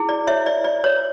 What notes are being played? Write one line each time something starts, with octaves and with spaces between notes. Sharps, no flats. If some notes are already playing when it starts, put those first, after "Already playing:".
Already playing: E4 G#4
D5
C#5 E5
D5
D5
C#5